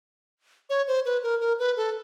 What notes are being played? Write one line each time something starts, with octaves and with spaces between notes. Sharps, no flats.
C#5
C5
B4
A#4
A#4
B4
A4